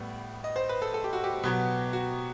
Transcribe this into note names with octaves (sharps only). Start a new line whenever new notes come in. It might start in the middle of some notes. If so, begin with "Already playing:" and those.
Already playing: A2 G3 B3
D#5
C5
B4
A4
A4
G4
F#4
G4
B2 F#3 B3
F#4